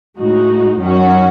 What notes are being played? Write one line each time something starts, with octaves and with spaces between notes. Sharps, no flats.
A2 G#3 D#4 F#4
F#2 D#3 F#3 C#4 F#4